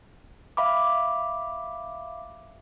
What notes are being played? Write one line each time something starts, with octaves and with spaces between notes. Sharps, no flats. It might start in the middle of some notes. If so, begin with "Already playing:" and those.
E5 F5 B5 D6